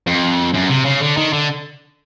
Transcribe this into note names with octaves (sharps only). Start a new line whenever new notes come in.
F2
F#2
C3
C#3
D3
D#3
D3